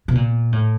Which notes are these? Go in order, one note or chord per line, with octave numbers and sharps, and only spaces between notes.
B2
A#2
A2